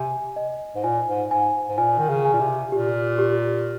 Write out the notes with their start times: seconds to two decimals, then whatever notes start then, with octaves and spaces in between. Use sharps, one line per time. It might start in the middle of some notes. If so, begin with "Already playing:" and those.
Already playing: C3 G#5
0.36 D#5
0.75 G#2
0.83 A#2 G#5
1.07 G#2
1.31 G#2 G#5
1.69 G#2
1.78 A#2 G#5
1.98 D#3
2.09 C#3
2.25 G#5
2.33 A#2
2.40 C3
2.72 A#2 G4
3.18 G4